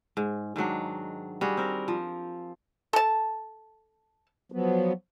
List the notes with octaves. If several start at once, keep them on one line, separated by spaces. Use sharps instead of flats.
G#2
G#2 D#3 F#3 D4
G3 F#4 G#4
C4 A#4
F3
A4 A5
F3 F#3 B3